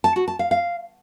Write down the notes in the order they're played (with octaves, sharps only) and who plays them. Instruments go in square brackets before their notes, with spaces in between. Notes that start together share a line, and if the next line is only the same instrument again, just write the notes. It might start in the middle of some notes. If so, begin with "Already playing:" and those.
[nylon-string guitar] A5
F#4
A5
F5
F5